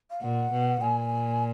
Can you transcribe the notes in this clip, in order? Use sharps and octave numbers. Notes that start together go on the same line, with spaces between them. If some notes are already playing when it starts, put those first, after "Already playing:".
F5
A#2 F#5
B2
A#2 G#5